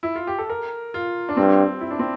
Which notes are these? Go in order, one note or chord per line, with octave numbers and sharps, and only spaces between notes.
E4
F4
G4
A4
A#4
F4
D4
G2 C4
E4
D4
C4